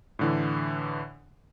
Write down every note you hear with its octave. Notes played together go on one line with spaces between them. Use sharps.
A2 D3 E3